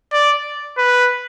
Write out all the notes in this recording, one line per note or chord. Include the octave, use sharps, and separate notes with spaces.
D5
B4